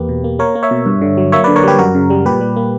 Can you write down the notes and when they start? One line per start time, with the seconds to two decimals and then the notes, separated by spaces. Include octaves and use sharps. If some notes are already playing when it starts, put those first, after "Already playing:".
Already playing: E2 A#3 G4 B4
0.09 B2
0.24 A#3
0.39 A#3 A#4 C#5
0.55 A#3
0.63 C#5 E5
0.71 B2
0.86 G2
1.02 D3
1.18 F#3
1.32 A#3 C#5 E5
1.44 B4 D5
1.48 D3
1.56 A#4 C#5
1.63 G3 G4 B4
1.78 F#2 F#4 A#4
1.95 C#3
2.10 G3
2.25 A#2 G4 B4
2.41 G3
2.56 A#3